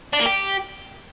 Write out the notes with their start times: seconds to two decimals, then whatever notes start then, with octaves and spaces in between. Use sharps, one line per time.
0.13 D4
0.20 A#3
0.26 G4